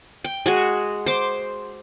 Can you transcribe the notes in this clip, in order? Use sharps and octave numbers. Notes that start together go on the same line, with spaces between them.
G5
G#3 F#4 G#4
C5 D6